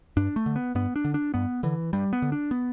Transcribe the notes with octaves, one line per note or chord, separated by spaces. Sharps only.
G2 D4
A3
D3
B3
G2 B3
D4
D3
D4
G2 B3
D3 E3
G2 G3
B3
D3
D4
B3